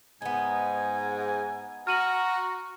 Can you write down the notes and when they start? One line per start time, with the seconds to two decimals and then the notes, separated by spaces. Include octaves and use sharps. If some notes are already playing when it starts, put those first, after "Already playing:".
0.22 G#2 B3 D#4 G#5
1.87 F#4 A#5 F6 D#7 F#7